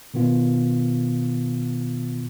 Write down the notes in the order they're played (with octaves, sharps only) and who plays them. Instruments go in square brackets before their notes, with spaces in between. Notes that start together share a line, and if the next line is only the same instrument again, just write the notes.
[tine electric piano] B2 D#3 B3 F4